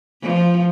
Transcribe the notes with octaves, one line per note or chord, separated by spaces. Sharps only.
F3